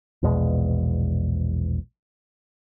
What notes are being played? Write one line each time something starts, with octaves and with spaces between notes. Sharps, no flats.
A#1 E2 B2 G#3